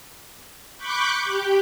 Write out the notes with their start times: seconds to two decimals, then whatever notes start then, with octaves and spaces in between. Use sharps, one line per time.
0.78 B5 C#6 D6 F#6 G6
1.24 G4